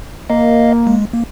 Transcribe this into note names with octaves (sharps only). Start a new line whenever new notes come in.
A#3 D#5 F5
G#3
A#3